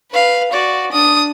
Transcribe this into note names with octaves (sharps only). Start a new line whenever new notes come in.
B4 F5
F#4 D5
D4 D#6